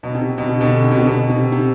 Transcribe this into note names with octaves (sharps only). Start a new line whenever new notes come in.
B2
C3
B2
C3
B2 D3
C3
B2
C3
B2
C3
C3